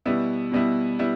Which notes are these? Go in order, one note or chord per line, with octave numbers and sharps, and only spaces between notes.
B2 G3 B3 E4
B2 G3 B3 E4
G3 B3 E4